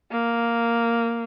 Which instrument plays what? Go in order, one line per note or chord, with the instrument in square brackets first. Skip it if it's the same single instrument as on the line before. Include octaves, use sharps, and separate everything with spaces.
[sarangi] A#3